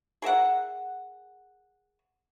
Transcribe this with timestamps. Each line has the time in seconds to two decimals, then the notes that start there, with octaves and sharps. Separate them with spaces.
0.22 G#4 A#4 E5 F#5